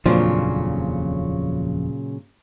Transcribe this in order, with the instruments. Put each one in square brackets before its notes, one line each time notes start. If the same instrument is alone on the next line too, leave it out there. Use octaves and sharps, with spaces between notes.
[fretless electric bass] D#1 F2 D4 [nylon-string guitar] A#2 C#3 F#3 [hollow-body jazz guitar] F3